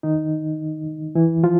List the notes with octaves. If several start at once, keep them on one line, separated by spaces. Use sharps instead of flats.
D#3 D#4
E3 E4
F3 F4